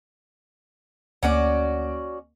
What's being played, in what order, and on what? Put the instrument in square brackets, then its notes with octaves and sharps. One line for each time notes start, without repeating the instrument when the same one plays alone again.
[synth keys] D2 A#3 D7 [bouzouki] C#4 F#4 D5